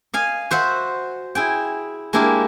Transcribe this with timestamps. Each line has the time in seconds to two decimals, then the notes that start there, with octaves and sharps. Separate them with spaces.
0.14 D#5 F5 G#5
0.51 F#4 C5 E5 F#5
1.35 E4 G#4 G5
2.13 G#3 A#3 D4 E4 G4 A#4